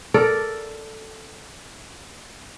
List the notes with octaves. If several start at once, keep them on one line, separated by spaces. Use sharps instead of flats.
A4 A#4 D5